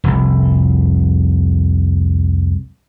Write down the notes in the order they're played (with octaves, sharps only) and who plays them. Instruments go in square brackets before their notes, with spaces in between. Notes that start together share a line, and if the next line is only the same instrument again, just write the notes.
[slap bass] F1 C2